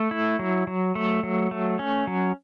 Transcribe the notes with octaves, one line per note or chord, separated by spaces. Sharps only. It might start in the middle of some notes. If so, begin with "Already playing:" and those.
Already playing: A3
E4
F#3
F#3
A3
F#3
A3
C#4
F#3